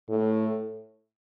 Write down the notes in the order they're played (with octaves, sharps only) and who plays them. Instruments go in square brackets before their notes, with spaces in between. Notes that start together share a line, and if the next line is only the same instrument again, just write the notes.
[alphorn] A2